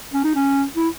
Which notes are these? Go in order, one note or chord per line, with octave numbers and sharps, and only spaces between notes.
C#4
D#4
C#4
E4